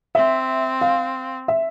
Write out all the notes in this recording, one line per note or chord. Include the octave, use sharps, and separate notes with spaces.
C4 E5
F5
E5